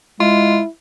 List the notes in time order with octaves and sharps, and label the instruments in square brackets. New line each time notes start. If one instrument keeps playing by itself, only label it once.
[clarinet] G#3 [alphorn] E4 [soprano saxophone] F4